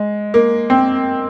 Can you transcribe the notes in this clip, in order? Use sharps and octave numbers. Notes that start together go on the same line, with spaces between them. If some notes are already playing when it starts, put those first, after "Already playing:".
Already playing: G#3
A#3
C4